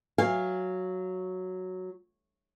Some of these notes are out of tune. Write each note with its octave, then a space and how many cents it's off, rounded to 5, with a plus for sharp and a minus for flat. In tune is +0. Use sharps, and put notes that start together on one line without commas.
F#3 +0 F5 +0 G#5 -30